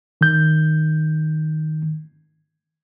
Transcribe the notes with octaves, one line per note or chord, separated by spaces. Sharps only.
D#3 G6